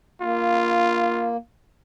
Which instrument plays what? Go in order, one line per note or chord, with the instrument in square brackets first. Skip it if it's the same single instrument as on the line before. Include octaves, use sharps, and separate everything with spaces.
[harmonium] A#3 [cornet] F4